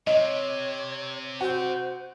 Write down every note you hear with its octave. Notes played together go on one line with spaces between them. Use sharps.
C3 C#5 D#5
F#4 C5